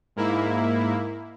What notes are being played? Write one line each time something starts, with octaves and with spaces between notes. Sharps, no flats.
G#2 A#3 E4